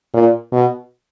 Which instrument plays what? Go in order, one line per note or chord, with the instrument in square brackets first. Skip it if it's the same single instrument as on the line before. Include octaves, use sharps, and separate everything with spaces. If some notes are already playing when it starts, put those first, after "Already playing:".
[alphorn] A#2
B2